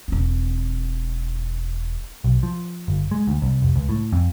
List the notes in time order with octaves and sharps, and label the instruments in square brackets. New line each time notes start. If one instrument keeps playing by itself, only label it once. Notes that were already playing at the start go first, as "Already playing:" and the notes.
[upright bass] E1 C4
[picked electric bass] B1
F3
G1
G#3
D2
C2
F1
C#2
A2
F2